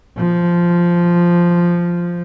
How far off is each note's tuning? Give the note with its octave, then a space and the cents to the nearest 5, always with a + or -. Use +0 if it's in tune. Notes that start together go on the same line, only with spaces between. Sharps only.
F3 -5